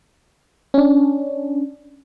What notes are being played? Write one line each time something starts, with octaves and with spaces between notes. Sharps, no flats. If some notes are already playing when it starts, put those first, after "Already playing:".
C#4 D4